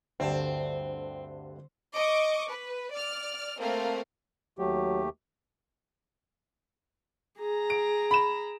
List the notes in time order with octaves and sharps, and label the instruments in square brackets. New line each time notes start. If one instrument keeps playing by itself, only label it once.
[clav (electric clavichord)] D2 G2 A5 [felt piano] D3 G3 [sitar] C4
[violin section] D#5 C#6 D6
B4
D5 F6
A3 A#3 C4 F5
[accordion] D#2 A3 G4 [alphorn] F#3
[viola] G#4 A#5
[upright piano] D7
B5 E7